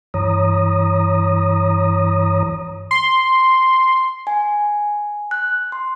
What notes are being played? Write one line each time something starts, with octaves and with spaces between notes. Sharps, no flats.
G2 E3 C#5 A#5 D#6
C6
G#5
F#6
C6